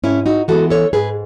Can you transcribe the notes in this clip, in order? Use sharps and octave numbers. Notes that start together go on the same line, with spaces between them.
G#2 C#4 E4
D#4 F#4
E3 G#3 B3 F#4 A4
A4 C#5
G#2 G#4 B4